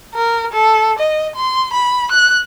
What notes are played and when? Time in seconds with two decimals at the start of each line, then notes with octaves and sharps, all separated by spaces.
0.15 A#4
0.53 A4
0.99 D#5
1.35 C6
1.73 B5
2.12 F#6